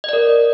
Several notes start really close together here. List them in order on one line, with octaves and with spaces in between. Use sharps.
D#5 D5 A#4